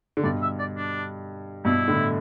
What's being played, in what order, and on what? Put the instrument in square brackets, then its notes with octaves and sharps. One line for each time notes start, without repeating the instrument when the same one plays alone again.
[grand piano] D3
[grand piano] G2 B2 [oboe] D5
[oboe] E5
D5
D4
[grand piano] G2 B2 [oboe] E4
[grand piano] A2 D3